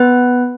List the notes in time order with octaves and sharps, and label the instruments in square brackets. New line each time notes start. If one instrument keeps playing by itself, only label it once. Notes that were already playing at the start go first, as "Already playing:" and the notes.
Already playing: [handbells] B3 B4